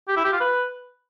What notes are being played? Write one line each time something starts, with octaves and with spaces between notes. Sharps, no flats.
G4
E4
G4
F4
B4